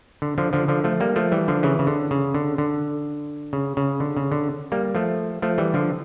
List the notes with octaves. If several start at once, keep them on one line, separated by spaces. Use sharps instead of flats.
D3
D3 F3
D3 F3
D3 F3
F3 A3
G3 A#3
F3 A3
E3 G3
D3 F3
C#3 E3
C#3
D3
C#3
D3
D3
C#3
C#3
D3
C#3
D3
G3 A#3
F3 A3
F3 A3
E3 G3
D3 F3